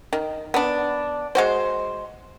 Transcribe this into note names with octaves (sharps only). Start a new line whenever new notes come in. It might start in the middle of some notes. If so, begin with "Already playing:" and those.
D#3
B3 D4
G#3 F#4 C5